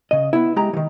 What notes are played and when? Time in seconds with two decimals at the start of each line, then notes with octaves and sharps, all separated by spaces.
0.11 C#3 D#5
0.33 B3 E4
0.56 G#3 G4 A#5
0.73 D#3 E3